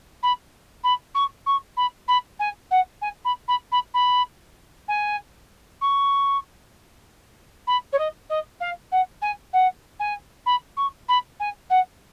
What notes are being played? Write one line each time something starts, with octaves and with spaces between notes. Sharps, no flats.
B5
B5
C#6
C#6
B5
B5
G#5
F#5
G#5
B5
B5
B5
B5
G#5
C#6
B5
C#5
D#5
D#5
F5
F#5
G#5
F#5
G#5
B5
C#6
B5
G#5
F#5